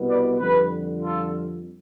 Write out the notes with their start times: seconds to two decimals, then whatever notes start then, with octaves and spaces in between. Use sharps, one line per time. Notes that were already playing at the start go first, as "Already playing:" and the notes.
Already playing: C2 B2 B3
0.09 B4 D5
0.39 F2 D3 G3 G4 B4
1.02 F4 A4